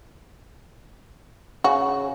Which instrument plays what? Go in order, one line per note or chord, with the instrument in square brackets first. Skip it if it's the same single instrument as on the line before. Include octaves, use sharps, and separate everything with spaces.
[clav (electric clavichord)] C#3 [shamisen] F#4